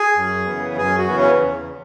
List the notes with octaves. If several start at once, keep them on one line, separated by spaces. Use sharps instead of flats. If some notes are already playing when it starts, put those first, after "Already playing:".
Already playing: G#4
F#2
C#3 E3 B3
F#2 G#4
F#4
C#3 E3 B3
C#4
E2